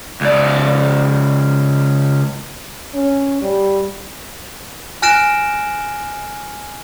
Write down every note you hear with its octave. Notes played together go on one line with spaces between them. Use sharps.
C#2 D5
C#4
G3
G#5 F6 F#6 A#6 D7 E7